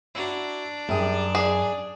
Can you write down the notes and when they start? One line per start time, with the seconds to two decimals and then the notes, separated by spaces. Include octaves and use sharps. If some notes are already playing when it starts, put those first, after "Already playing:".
0.15 D4 E4 F#4 A#5
0.89 F#2 G3 G#4
1.35 G#4 D5